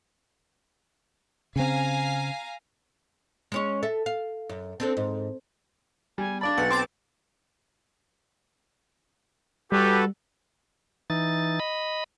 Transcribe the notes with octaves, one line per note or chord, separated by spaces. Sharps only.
C#3 C4 F5 G#5 A#5
G#3 C#4 C#5
A4 E5
F5
F#2
C4 D4 A4
G#2
G3 B3 G#5
D4 D5 F5 A5 B5 A6
B1 B4 F#5
C4 A5 D6
G3 F#4 G4 A4 B4
E3 D#4 A6
D#5 B5